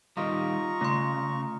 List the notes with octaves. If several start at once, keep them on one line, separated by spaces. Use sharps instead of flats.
D#3 G3 F4 D#5 A#5 C#6
C#3 A3 C6